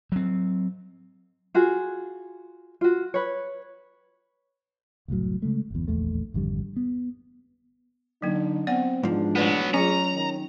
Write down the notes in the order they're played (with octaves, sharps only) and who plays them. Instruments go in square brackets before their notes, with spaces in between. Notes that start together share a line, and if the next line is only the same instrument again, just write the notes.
[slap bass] F#3 C4
[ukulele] F4 F#4 G#4
F4 F#4
B4 C#5
[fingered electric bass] F#1 C2 A2 F#3
C#3 G#3 A3
G1 E2
D1 A#1 E2 A3
G#1 F2 D3 G3
B3
[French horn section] D3 D#4 [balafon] F#3 A#3
[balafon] B3 D5 F#5 [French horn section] C4
[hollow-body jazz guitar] G#2 F3 [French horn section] E3 G#3 D4
[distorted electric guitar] F#3 B3 [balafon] A3 B4 D5
[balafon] F#3 F4 [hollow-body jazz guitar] C#4 [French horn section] G#4 [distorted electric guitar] A#5
[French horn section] D#3